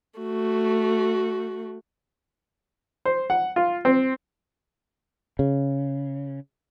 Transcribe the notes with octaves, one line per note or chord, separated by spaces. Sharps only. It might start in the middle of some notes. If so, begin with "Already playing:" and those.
A3 F#4
C5
F#5
F4
C4
C#3